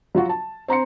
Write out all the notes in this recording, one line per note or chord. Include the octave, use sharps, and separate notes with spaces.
F#3 F4 F#4
A5
C4 A#5 C6 C#7